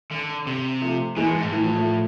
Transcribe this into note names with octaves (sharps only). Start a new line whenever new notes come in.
D3
C3
F3 A3
B2 E3 G#3
A2
G#2
A2
E3
F3
F3 A3